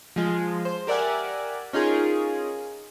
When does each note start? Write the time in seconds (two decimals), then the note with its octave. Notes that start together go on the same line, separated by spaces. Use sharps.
0.16 F3 G#3 F4
0.65 C5
0.87 G4 A#4 D5 E5 F#5 G#5
1.73 C#4 D#4 F4 G#4 A#4